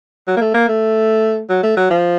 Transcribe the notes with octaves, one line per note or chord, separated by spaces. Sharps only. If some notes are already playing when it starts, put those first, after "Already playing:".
F#3
A#3
A3
A#3
A3
F#3
A3
F#3
F3